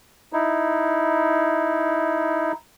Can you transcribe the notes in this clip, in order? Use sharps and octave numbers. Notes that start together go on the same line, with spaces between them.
D#4 E4